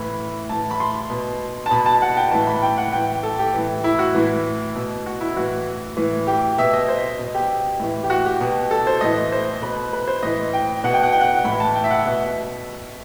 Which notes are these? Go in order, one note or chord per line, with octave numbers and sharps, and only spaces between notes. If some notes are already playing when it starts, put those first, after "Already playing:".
Already playing: A2 E3 B5
A2 E3 A5
B5
C6
B2
A5
B2 B5
A5
F#5
G5
A2 E3 A5
B5
G5
F#5
A2 E3 G5
A4
G4
A2 E3
E4
F#4
A2 E3
B2
F#4
E4
A2 E3 F#4
A2 E3
G4
B2 E5
D#5
C5
B2
G4
A2 E3
G4
F#4
G4
B2
A4
C5
A2 E3 D#5
C5
B2 B4
B4
C5
A2 E3 D#5
G5
B2 F#5
G5
F#5
G5
F#5
A2 E3 B5
A5
G5
E5
F#5
B2 E5